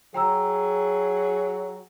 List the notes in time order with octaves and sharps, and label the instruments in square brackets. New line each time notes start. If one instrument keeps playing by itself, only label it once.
[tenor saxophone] F#3 [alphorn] G#4 [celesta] G5 A#5 E6